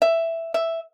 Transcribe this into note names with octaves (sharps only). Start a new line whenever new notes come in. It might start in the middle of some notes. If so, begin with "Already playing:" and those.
E5
E5